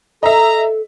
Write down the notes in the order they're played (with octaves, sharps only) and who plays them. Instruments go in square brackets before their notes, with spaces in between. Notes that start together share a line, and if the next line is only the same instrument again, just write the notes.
[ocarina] A4 [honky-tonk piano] D#5 E5 [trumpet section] A#5